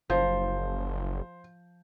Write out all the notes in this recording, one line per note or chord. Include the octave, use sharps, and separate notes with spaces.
F#1 F3 C5